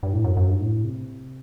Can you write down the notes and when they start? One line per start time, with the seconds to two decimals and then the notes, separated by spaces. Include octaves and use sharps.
0.03 G2
0.13 A2
0.24 F#2
0.37 F#2
0.49 G2
0.60 A2
0.84 C3